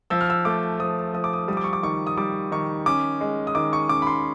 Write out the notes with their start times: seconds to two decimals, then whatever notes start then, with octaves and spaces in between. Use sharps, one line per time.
0.10 F3 E6
0.21 F6
0.30 E6
0.45 A3 D6
0.80 F3 D#6
1.14 F3 D#6
1.24 D6
1.33 D#6
1.48 G3 D#6
1.57 D6
1.64 C#6
1.73 D6
1.83 D#3 C#6
2.07 D#6
2.17 G3 D6
2.52 D#3 C#6
2.86 C#4 D6
3.21 G#3
3.47 D#6
3.55 D#3 D6
3.73 C#6
3.89 C#4 D6
4.02 B5
4.07 C6